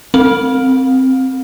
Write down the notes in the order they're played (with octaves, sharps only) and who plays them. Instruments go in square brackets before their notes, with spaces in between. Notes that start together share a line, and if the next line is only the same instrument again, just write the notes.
[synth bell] C4